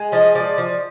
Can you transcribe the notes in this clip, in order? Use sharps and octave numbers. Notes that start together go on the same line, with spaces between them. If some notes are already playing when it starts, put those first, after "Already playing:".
Already playing: G#3
F3 D#5
F3 D5
F3